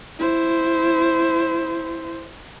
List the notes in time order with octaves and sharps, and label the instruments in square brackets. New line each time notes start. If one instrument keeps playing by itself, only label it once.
[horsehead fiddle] E4 C5